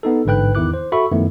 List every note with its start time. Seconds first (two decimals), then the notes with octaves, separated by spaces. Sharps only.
0.03 B3 D#4 A4
0.25 A1 G#2 D3 B4 G5 F#6
0.55 E2 D#3 E4 D6 F#6
0.74 C5
0.92 F#4 A4 E5 B5 C#6
1.12 F#2 D#3 F3 A3 B3 E4